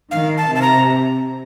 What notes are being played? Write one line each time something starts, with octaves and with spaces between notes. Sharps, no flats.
D#3 F5
A5
C3
A5
A#5